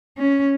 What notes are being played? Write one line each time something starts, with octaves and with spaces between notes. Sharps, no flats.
C#4